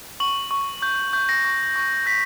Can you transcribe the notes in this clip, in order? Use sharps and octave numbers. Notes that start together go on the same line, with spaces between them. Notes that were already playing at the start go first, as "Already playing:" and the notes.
C#6 F#7
C#6
C#6 G6
C#6 G6
A#6
C#6
C#6
G6 B6